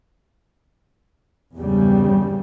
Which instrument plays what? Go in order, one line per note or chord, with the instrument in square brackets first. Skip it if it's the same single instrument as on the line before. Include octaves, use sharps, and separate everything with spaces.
[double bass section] G#1 E2 G2 C#3 G3